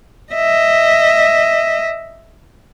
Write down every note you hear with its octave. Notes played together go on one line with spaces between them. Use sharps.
D#5 E5